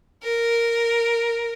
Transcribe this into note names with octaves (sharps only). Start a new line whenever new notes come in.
A#4